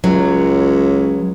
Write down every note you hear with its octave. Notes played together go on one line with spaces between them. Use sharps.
C#2 F#3